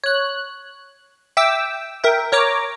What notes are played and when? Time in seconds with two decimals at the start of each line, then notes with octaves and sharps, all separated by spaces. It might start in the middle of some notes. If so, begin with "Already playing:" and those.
0.04 C#5 F#6
1.37 E5 G5 D6 E6
2.04 A#4 E5 G5
2.32 A#4 C#5 A#5 D6